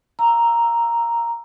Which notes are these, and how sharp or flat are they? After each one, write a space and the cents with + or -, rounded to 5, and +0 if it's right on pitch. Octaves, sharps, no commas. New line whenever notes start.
F5 +0 A#5 +0 E6 +10